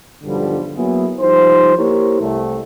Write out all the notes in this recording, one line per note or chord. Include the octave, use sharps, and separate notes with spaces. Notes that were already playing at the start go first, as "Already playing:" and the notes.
B1 G2 D3 F3 G3
F#3 A#3 B3 E4 G#4
F3 G3 D#4 C5
A#3 E4 G4 A#4 C5 C#5
C2 A3